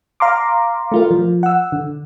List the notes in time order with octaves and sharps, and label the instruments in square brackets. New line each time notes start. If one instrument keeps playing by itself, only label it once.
[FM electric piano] F5 A#5 C6 D6
A3 F4 A#4
F3
F#5 E6
D3